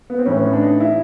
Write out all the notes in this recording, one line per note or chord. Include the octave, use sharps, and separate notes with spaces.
B3
C4
A2 E3 C#4
D#4
D4
D#4
E4